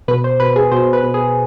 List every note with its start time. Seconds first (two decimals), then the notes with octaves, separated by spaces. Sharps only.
0.08 B2 B4
0.24 C5
0.40 B2 B4
0.56 G#4
0.72 B2 C5
0.93 B4
1.04 B2
1.14 G#4